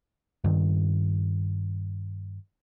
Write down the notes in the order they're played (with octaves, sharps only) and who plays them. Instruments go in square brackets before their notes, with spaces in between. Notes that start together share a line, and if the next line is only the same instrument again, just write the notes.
[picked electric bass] G2 D#3